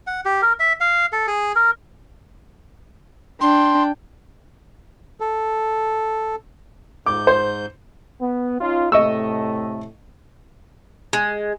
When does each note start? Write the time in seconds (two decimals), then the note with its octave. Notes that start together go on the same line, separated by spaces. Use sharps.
0.07 F#5
0.25 G4
0.42 A#4
0.60 E5
0.80 F5
1.12 A4
1.27 G#4
1.55 A#4
3.41 D4 G5 C6
5.20 A4
7.06 G#2 D6 G6
7.27 C5
8.21 B3
8.60 C#4 D#4 F4
8.92 A2 C3 A3 D#5 C#6 E6
11.13 G#3